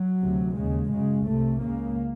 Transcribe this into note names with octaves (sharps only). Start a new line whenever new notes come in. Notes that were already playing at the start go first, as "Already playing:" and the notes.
Already playing: F#3
D2 C3
D#2 C#3 G#3
F#2 C#3 G#3
C2 C3 A3
C#2 C#3 A#3